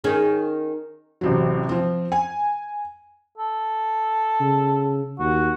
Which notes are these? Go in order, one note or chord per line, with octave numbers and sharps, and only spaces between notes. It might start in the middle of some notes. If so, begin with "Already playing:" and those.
D#3 C#4 G#4
A1 C3 F#3
F3 C4
G#5
A4
C#3
D#2 F#4